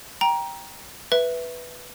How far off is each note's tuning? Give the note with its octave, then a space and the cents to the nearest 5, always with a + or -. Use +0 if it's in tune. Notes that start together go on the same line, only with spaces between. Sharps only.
G5 +0 A#5 +20
B4 +0 E5 +0